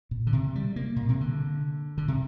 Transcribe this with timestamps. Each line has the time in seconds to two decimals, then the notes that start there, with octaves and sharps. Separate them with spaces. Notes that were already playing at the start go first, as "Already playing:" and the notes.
0.11 A#2
0.27 D3
0.33 C3
0.55 G3
0.76 A#3
0.96 A#2
1.09 C3
1.21 D3
1.98 D3
2.08 C3